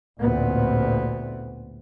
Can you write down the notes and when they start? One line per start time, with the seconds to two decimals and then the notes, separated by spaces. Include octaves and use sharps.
0.20 A1 D2 A#2 B3 C4